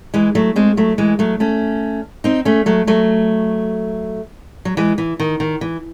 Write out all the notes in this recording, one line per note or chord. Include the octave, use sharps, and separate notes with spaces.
E3 G#3
F#3 A3
G#3 C4
F#3 A3
E3 G#3
F#3 A3
A3 C#4
C4 D#4
A3 C#4
F#3 A3
F#3 A3
F#3
E3 G#3
E3
D#3
D#3
E3